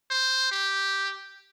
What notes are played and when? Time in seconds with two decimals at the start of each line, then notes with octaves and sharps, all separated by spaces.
0.10 C5
0.51 G4